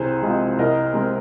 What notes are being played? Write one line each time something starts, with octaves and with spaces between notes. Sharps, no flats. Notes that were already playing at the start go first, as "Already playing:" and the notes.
Already playing: C2 G#4 C5
C3 F3 G#3
C2 A#4 D#5
C3 G#3 C4